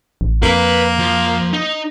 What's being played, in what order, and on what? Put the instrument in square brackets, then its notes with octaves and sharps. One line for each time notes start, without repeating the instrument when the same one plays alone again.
[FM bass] A1
[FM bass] F2 [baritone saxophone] A#3 [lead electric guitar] B4
[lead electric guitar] F3
D#4